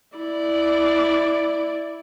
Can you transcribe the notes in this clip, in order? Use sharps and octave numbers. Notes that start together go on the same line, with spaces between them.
E4 D5